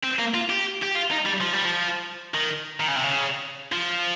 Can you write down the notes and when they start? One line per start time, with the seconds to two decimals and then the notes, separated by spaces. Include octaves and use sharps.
0.03 C4
0.19 A#3
0.34 F4
0.50 G4
0.82 G4
0.95 F4
1.11 D#4
1.26 G3
1.41 F3
1.54 G3
1.65 F3
2.34 D#3
2.80 D#3
2.88 C#3
2.96 C3
3.04 C#3
3.72 F3